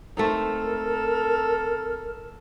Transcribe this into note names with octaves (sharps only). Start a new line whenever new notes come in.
A3 C4 D#4 A4 A#4